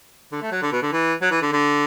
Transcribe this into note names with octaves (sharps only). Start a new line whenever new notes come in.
D3
A3
F#3
D3
B2
D3
E3
F#3
E3
D3
D3